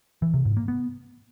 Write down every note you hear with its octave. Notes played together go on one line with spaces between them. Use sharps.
E3
C3
G#2
A#3
B3